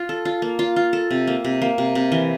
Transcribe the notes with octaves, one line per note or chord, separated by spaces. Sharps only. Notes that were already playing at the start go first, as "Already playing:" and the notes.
Already playing: F4
A4
F4
A#3
F4
F4
A4
C3
A#3
C3
A#3
C3
C3
E3